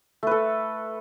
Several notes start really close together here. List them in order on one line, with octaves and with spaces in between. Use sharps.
A3 B4 A4